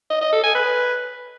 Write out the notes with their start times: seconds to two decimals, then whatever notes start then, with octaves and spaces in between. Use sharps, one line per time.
0.10 D#5
0.22 D#5
0.33 A4
0.44 G#5
0.55 B4